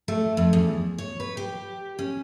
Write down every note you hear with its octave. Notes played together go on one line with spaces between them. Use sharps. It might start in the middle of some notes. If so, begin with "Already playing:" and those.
A3
F2
E2
C#5
B4
G4
C#4